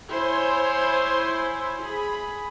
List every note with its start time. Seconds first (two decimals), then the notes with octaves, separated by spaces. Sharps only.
0.11 E4 C5 C#5 G#5 C6
1.82 G#4 B5